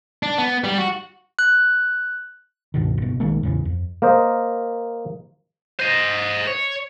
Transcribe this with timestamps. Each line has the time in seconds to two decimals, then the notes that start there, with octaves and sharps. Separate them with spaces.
0.23 D4
0.38 B3
0.64 G3
0.78 F#4
1.39 F#6
2.74 C#2 G2 B2 D#3
2.98 F#1 B2
3.20 B1 D#3 G#3 A#3
3.43 E2 A2 C#3 E3
3.65 F2
4.02 A#3 A#4 C5 D#5
5.79 C5 D#5
6.47 C#5